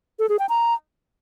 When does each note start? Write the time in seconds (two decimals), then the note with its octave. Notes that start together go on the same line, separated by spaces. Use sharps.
0.19 A4
0.29 G#4
0.39 G5
0.49 A#5